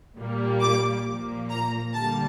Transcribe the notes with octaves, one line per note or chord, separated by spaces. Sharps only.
A#2 G3 A#3
D6
A#2 F3 A#3
A#5
D3 G3 A#3 A5